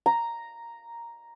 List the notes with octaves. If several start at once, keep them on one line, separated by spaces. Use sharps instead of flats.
A#5